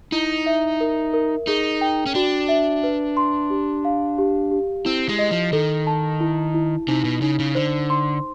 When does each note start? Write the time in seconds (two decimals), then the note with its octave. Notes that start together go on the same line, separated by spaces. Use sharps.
0.12 D#4 E4
0.46 E5
0.81 A#4
1.14 A#4
1.47 D#4 G#4
1.81 G5
2.06 C#4
2.15 D4 F#4
2.49 E5
2.83 B4
3.17 C6
3.50 G4
3.85 F5
4.18 G4
4.51 G4
4.85 C4 E4
5.09 G#3
5.19 D#5
5.31 F3
5.53 D#3 A4
5.87 A5
6.21 E4
6.54 E4
6.88 C3 D#4
7.05 B2
7.22 C#3 D#4
7.39 C#3
7.55 D3 C5
7.90 C6